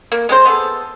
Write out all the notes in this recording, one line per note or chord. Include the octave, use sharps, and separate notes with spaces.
A#3
G#3 C4 C5
B3 G#4 A4